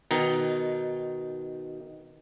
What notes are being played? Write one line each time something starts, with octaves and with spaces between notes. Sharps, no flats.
B2 D#3 D#4